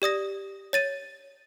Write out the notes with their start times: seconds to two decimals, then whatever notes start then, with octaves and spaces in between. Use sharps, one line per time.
0.02 G4 D5 D#6 A#6
0.73 C#5 A6 D#7